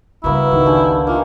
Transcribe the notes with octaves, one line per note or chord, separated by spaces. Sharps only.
C#3 G3 A#3 B3 E4 F#4
G#1 C#2 D#3 F#4
D3 G4 G#5
D#3 E3 A#3 F4 G#4